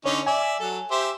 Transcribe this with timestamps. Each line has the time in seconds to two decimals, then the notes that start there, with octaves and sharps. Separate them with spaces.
0.06 D3 C#4 D#4 C#5
0.27 D5 E5 G#5
0.60 F#3 A4
0.91 G4 C5 E5